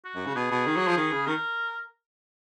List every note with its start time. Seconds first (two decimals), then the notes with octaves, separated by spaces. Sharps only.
0.05 F#4
0.15 F#2
0.26 C#3
0.35 B2 G#4
0.51 B2
0.66 D#3
0.76 F#3
0.87 F3
0.97 D#3
1.12 C#3
1.27 D#3 A#4